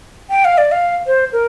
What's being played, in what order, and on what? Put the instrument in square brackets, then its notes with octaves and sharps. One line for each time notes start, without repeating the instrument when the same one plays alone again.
[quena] G5
F5
D5
F5
C5
A#4